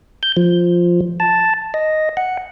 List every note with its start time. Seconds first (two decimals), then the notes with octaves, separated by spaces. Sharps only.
0.23 G6
0.37 F3
1.20 A5
1.74 D#5
2.17 F#5